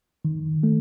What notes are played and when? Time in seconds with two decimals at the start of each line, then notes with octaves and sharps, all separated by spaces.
0.25 D#3
0.63 A3